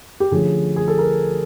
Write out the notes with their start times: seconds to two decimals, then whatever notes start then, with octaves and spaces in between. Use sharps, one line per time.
0.20 G4
0.31 D3 F3 A3 C#4 G#4
0.76 G#4
0.88 A4
0.98 A#4